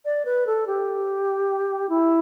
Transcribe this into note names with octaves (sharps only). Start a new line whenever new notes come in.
D5
B4
A4
G4
E4